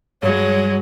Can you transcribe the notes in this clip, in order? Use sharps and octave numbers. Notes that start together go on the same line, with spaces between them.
G2 F#3 G#3 C#5